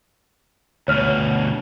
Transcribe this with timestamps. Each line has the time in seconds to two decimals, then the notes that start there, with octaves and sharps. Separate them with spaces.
0.88 D2 B2 C#5 F6